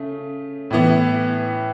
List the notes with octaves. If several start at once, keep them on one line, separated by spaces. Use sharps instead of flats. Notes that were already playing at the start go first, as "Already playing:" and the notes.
Already playing: C#3 A3
A2 E3 B3